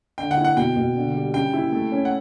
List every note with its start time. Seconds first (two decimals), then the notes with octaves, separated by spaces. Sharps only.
0.18 D3 G5
0.31 F#5
0.37 E4
0.45 F#5
0.56 B2 G5
0.76 B2
0.95 D3
1.14 G3
1.34 C#3 G5
1.53 E4
1.72 A3
1.92 C#4
2.05 F#5